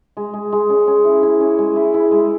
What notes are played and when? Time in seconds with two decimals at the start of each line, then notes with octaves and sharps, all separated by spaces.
0.17 G#3
0.34 G#3
0.52 G#3
0.70 C#4
0.87 C#4
1.05 E4
1.23 E4
1.41 C#4
1.59 G#3
1.76 E4
1.94 E4
2.11 G#3